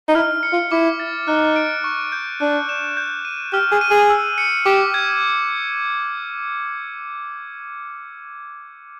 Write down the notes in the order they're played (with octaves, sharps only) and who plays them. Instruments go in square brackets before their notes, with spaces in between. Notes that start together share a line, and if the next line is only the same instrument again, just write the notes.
[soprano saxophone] D#4
[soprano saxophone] E4 [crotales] F6
[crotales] C#7
[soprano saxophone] F4
[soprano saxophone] E4 [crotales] D6
[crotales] A6
[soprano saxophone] D#4 [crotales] F#6
[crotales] D7
C#6
G6
[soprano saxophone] D4 [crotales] F#6
[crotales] E7
G6
D#7
[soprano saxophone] G4 [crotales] F6
[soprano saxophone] G#4
[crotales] D#7
[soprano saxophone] G#4
[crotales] E6
C#7
[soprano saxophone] G4 [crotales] D6
[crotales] G#6